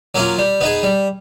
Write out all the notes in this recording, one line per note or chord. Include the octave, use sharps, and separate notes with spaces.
F#3 A#3 C#4 F4
G3
B3 D#4 G#4
G3